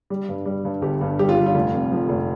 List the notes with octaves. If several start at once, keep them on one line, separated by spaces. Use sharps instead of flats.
G3
G2
G3
G2
G1 G4
G2
G3 G4
F4
G3
F4
F1
F2
F3
F1